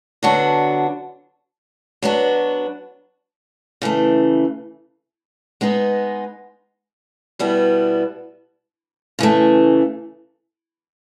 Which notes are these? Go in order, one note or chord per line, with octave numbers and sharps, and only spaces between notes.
D3 F#3 B3 D4 F#4
F#3 B3 D4 F#4
C#3 E3 A3
G#3 B3 D#4 G#4
B2 G3 B3 E4
C#3 E3 A3